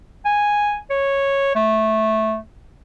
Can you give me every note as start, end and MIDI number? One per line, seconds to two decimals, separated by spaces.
0.26 0.78 80
0.90 1.51 73
1.55 2.37 57